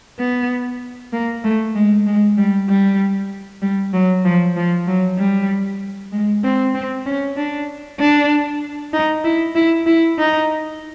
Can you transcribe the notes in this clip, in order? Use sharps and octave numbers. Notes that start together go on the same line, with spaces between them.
B3
A#3
A3
G#3
G#3
G3
G3
G3
F#3
F3
F3
F#3
G3
G#3
C4
C4
C#4
D4
D4
D#4
E4
E4
E4
D#4